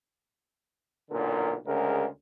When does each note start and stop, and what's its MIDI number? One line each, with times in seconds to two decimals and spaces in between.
1.10 1.54 35
1.10 1.54 46
1.10 1.54 50
1.10 1.54 70
1.66 2.06 38
1.66 2.06 49
1.66 2.06 56
1.66 2.06 70